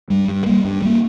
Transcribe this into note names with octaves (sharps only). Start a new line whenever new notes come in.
G2 G3
G2
G3 A#3
G2
G3 A#3